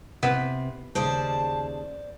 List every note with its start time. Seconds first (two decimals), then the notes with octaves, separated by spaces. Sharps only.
0.23 C3 B3 E4 B4
0.95 D#2 C#3 C5 D5 A5